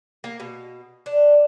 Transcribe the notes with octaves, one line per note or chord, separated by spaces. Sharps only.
A#3
B2
D4